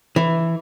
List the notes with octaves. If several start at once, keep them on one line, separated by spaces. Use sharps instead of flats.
E3